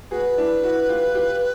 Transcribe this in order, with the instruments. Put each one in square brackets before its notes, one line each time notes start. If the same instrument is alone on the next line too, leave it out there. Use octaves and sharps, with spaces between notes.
[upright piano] F#4 G#4 [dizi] B4
[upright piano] D4 E4
E4 F#4
F4 G4
F4 G4